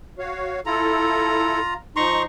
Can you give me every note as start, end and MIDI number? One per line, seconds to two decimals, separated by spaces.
0.19 0.60 66
0.19 0.60 73
0.19 0.60 77
0.66 1.60 64
0.66 1.74 65
0.66 1.60 69
0.66 1.74 82
1.96 2.25 53
1.96 2.25 63
1.96 2.22 82
1.96 2.22 84
1.96 2.22 85